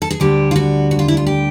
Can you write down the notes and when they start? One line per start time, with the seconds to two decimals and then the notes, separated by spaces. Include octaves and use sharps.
0.02 A4
0.11 G#4
0.20 D2 D3 G3 G4
0.51 F4
0.56 F#4
0.91 F#4
0.99 F4
1.08 E4
1.17 F4
1.26 G4